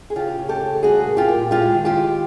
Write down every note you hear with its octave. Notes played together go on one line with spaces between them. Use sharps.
G#4
C#3 F4 G4
C#3
G4 A4
C#3
G3 F#4 G#4
A#2
F4 G4
A#2
G#3 F4 G4
D#3
F4 G4
D#3